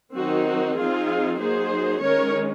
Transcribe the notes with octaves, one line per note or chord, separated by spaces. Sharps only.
D#3 F#3 C4 D#4 F#4
F#4
F3 C4 D#4 F4 G#4
F#3 A#3 D#4 G#4 C5
D#3 G#3 C#4 A#4 C#5